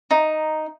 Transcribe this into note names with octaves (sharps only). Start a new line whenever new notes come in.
D#4